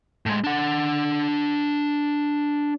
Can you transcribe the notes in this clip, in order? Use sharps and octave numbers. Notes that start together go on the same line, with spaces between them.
A2 G#3
D4 F#5